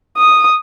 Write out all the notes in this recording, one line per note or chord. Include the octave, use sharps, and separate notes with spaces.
D#6